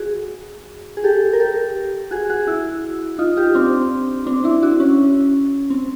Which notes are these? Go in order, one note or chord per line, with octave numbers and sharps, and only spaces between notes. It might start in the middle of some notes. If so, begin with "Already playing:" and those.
Already playing: F#4 G#4
G#4
G4 A4
A#4
G4 A4
F#4 G#4
F#4 G#4
E4 F#4
D#4 F4
F4 G4
C4 D4
C4 D4
D4 E4
E4 F#4
C#4
C4